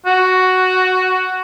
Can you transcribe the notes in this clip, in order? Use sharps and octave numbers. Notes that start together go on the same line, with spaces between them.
F#4